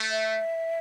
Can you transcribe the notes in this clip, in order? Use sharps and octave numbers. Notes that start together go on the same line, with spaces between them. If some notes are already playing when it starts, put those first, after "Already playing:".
Already playing: A3
E5